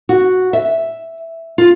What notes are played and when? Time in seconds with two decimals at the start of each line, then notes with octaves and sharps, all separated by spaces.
0.09 F#4
0.53 E5
1.58 F4